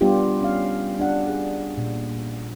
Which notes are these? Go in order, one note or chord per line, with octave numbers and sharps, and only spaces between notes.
G3 B3 D4 F4 G4
C#4 F5
D4 F#5
G#4
A#2